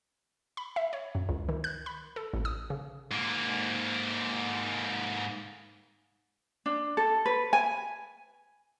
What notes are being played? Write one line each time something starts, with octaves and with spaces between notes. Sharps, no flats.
B5
E5
C#5
F#2
C#2
D#3
F#6
B5
A4
A1
D#6
C#3
G#2 A#3
D4
A4
B4
G#5